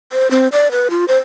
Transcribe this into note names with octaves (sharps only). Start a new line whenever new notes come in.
C5
C4
D5
B4
F4
C5